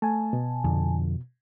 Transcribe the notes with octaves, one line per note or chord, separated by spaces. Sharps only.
A3 G#5 A5
B2
F2 D3